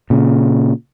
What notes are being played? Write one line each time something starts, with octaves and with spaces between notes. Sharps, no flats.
A#2 C#3